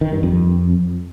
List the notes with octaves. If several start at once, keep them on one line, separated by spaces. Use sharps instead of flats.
D#3
G2
F2